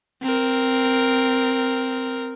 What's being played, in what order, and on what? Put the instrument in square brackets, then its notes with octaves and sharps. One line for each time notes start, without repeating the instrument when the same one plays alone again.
[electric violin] C4 A#4